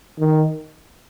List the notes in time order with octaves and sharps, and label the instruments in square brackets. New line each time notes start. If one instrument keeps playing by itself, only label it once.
[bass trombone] D#3